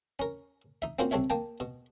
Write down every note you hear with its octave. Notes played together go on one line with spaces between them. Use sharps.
C#4 A#4
D#4 E5
A#3 C4 C#4 F4 F#4 C5
C2 C4 A4 C#5 E5
A#3 G5 A5
B2